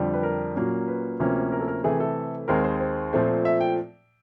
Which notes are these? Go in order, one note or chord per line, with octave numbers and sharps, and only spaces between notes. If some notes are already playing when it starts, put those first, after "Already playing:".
Already playing: F2 D3 G3
B4
A#4
A#2 F#3 A#3 C#4
B4
D2 C3 F3 A#3 C#4
A#4
A4
A#4
C3 E3 A3 G#4
A4
D#2 D#3 G#3 C4 A#4
C5
C5
A#2 F3 A3 C4
E5
G5